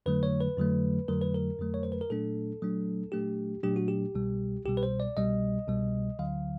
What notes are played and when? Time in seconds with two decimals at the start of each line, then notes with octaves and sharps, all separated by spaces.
0.06 F2 D3 F#3 A3 B4
0.23 C#5
0.40 B4
0.57 F2 D3 F#3 A3
1.08 F2 D3 F#3 A3 A#4
1.21 B4
1.35 A#4
1.59 F2 D3 F#3 A3
1.74 C#5
1.83 C5
1.92 B4
2.01 A#4
2.10 A#2 F#3 A3 D4 A4
2.61 A#2 F#3 A3 D4
3.12 A#2 F#3 A3 D4 G4
3.63 A#2 F#3 A3 D4 G4
3.76 F#4
3.88 G4
4.15 C2 B2 G3
4.65 C2 B2 G3 G4
4.77 B4
4.83 C5
5.00 D5
5.16 C2 B2 G3 D#5
5.68 C2 B2 G3
6.19 D2 D3 F#3 F5